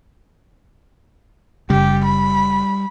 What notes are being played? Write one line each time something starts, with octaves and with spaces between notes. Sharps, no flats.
F#1 C#3 G3 G4
B5